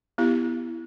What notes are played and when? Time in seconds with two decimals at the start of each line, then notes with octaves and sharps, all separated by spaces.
0.18 B3 E4 G4